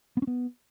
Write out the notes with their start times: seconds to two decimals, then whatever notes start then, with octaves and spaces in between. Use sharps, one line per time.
0.17 B3
0.22 C#4
0.27 B3